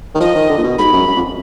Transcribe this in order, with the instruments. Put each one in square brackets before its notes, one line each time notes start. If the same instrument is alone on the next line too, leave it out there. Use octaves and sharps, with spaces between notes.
[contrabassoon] D#3
[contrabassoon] F3 [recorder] D#5
[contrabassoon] D#3
D3
A#2
B2
[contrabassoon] G#2 [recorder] B5
[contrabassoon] F#2
F#2
F2